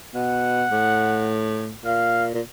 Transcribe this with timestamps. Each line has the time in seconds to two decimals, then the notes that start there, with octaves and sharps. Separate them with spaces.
0.15 B2 F#5
0.72 A2
1.84 A#2 F5
2.34 A#2